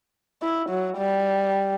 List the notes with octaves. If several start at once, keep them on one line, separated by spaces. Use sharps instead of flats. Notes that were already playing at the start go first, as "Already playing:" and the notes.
E4
F#3
G3